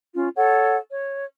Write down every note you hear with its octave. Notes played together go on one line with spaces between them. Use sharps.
C#4 F4
A4 C#5 F#5
C#5